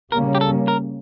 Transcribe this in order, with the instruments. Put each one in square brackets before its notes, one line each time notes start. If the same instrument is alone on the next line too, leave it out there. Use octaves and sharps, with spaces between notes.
[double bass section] C#3 G3 A#3 C#4 [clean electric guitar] A#4
[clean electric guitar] G4
A4
A#4